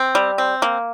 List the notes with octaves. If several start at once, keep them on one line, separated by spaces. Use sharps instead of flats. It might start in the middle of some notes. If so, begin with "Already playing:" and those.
Already playing: C4
G3
C4
A#3